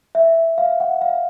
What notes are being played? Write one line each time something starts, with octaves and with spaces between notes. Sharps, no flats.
E5
F5
F#5
F5